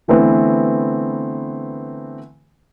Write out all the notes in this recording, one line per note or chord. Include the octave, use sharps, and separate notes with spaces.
D3 E3 A3 B3 C4